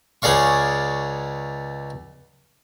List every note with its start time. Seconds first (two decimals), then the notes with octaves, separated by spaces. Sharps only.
0.22 C#2 G#4 D5 F5 C#6